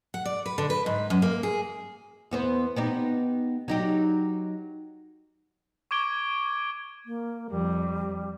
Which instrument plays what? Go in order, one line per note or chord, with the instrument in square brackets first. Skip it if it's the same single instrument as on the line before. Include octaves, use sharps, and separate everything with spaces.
[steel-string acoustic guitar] F#5
D5
B4
D3
B4
G#2
F#2
A#3
G#4
[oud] E2 B3 C5
B3 D#4 G4
F#3 D#4 G4
[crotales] C#6 D6 G#6 D7 G7
[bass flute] A#3
[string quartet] F2 [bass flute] G3